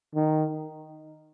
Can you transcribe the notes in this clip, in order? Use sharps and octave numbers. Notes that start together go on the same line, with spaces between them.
D#3